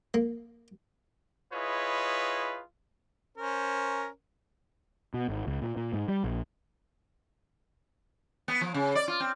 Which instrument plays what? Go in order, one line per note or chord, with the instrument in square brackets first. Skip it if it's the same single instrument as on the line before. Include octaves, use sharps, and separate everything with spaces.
[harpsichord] A#3
[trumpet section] E4 F4 G#4 B4 C#5 D#5
[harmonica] C#4 A#4 C5
[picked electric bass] B2
G#1
C#2
A#2
A#2
G#2
G3
A#1
[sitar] B3
F3
C#3
D5
F4
C4